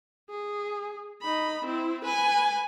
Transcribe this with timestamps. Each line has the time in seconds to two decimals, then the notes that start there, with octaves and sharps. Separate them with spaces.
0.30 G#4
1.22 D#4 B5
1.65 C4 E4
2.05 B4 G#5